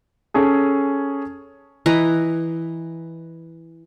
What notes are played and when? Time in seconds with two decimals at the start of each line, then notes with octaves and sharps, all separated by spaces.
0.34 C#4 G#4 A4
1.86 E3 B4 D#5 A#5